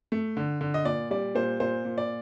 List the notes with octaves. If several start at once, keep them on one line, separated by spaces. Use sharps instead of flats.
A3
D3
D3
D#5
A#2 D5
G3 D5
A#2 C5
A#2 C5
A#2
D5